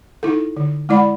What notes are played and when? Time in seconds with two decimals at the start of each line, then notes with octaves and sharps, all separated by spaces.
0.23 D#4 E4 A4
0.57 D3
0.89 G#3 E4 D5 F#5 B5